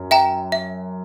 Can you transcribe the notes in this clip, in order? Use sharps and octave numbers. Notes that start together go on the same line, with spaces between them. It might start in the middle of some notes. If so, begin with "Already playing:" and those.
Already playing: F#2
E5 G5 A#5
E5